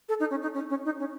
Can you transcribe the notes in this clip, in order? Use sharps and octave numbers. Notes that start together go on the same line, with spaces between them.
A4
D#4
C#4
D#4
C#4
C#4
D#4
C#4